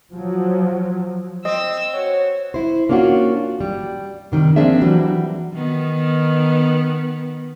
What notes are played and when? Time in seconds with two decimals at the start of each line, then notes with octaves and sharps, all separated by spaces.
0.14 F3 F#3
1.45 C4 D#5 E6
1.94 F#4 C#5
2.54 E4 C5
2.89 A#3 C#4 D4 F4 F#4
3.61 G3
4.32 C3 D#3 G3
4.56 F3 A#3 C4 D4 G#4 E5
4.81 E3 F#3 G3
5.54 D#3 B3